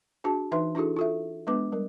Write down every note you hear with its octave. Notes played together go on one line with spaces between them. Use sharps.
D4 F#4 G#4 A5
E3 D#4 B4 E5 C6
D4 E4 F#4 G#4 A4
F4 A4 E5
G#3 B3 D4 B4 D6
G3 A#4